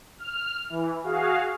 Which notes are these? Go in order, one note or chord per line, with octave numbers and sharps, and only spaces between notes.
F6
E3
F#4 G#4 F5